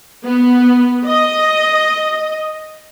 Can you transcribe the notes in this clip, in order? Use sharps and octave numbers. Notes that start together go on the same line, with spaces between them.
B3
D#5